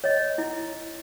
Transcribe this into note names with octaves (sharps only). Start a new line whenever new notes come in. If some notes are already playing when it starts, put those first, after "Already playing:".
C#5 D#5
E4